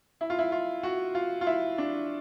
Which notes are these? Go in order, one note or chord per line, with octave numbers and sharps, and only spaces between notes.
E4
F4
E4
F4
F#4
F4
F4
E4
D4